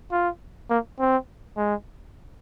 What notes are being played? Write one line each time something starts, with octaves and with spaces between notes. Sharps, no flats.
F4
A#3
C4
G#3